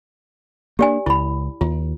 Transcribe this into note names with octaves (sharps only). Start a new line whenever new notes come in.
A#3 C4 D4 G4 D5 G#5
C#2 E4 B5
D#2 F4